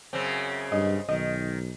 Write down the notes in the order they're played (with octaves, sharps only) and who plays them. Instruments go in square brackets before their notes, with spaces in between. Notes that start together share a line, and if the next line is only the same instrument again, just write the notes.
[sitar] F#2 C#3 C4
[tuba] G2 [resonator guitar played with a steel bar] D#5
[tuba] B1 [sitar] D#3 [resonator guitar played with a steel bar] D#5